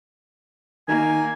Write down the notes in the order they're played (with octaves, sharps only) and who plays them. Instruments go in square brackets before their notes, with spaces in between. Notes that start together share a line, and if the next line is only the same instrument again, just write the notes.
[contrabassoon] D#3 [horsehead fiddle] A#3 [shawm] G#5